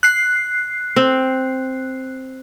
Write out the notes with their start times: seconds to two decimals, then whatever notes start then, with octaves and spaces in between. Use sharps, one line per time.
0.03 F#6 C7
0.96 C4